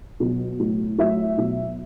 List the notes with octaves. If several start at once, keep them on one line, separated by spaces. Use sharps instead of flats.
B2 F#3
A2 F#3
A2 F#3 E5
B2 F#3